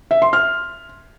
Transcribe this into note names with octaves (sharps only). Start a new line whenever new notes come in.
E5
C6
F6